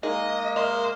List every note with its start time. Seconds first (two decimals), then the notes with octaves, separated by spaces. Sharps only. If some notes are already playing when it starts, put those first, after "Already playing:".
0.03 G#3 A#3 D#4 G#4 A#4 D#5
0.56 A#2 A#4 C5 D#5 E5